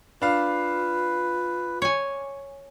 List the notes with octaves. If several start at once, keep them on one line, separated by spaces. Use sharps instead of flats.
D4 F4 B4 F5
C#5 G#5